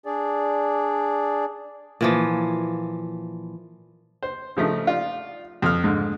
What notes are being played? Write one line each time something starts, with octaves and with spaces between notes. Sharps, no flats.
D4 G#4 D5
A#2 E3 F3
C5
C#3 F3 A3 D#4
F4 D5
F2 F6
G#2 D3